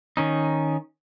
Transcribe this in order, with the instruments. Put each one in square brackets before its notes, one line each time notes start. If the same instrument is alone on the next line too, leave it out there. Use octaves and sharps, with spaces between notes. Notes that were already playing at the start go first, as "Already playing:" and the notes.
[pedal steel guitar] D#3 C#4 D#4